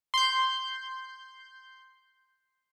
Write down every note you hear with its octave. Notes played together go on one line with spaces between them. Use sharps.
C6 G6